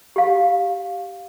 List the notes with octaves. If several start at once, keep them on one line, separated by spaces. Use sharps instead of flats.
G4 F5